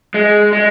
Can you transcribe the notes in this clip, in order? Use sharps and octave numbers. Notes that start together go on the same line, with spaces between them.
G#3
G#3